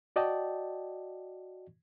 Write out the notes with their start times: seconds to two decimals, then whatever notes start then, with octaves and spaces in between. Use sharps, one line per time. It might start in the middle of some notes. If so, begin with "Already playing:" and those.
0.16 F#4 D5 D#5 G5 A5